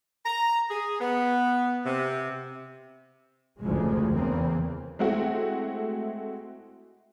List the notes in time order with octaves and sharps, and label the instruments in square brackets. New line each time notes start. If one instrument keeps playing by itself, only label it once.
[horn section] A#5
G#4
B3
C3
[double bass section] F1 D2 C#3 E3 F3 G#3
E2 C#3 E3 A#3 C4
[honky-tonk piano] G#3 A3 C4 E4 F#4